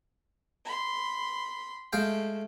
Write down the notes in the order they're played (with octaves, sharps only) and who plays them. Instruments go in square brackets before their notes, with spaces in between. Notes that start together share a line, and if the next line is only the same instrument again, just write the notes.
[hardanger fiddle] B5 C6
[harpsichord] G#3 F5 G5 [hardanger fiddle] A3